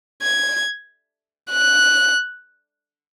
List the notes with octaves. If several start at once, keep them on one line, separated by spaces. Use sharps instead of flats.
G#6
F#6